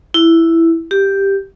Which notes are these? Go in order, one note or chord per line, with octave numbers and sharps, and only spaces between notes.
E4
G4